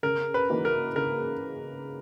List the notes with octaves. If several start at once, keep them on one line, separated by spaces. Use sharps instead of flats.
C#3 A#4
B4
E3 A#3 D#4 F#4
A#4
C#3 A#4